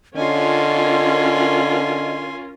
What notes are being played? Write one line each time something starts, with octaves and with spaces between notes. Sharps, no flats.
D3 C#4 F4 A#4 D#5 G#5 C6